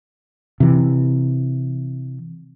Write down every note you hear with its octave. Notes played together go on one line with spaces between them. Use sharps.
C3 E3